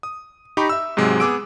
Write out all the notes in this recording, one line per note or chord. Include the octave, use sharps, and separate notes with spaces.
D#6
D#4 G4 A#5 B5 C#6
E5 E6
G#2 C3 F#3 G#3
B3 G#4 D6 E6 D7